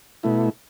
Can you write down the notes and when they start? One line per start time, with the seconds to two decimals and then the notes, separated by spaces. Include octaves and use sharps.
0.23 B2 A3 E4